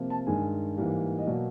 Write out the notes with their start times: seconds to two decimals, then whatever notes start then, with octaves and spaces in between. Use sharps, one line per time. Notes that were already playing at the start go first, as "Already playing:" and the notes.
Already playing: C3 F3 A#3
0.10 A5
0.27 G2 D#3 G#3 G#5
0.77 G#2 E3 G3 A#3
1.18 D#5
1.27 B2 F#3 A#3 D5